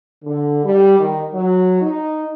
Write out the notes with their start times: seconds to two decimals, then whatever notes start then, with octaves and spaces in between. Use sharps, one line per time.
0.24 D3
0.64 G3
0.98 D#3
1.33 F#3
1.81 D#4